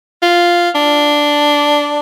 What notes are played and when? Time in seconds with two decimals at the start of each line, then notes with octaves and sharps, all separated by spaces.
0.22 F4
0.75 D4